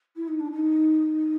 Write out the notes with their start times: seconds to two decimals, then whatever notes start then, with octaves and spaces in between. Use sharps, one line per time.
0.16 E4
0.28 D#4
0.40 D4
0.52 D#4